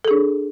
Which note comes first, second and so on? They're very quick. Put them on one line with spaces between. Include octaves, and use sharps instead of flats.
A4 G#4 D4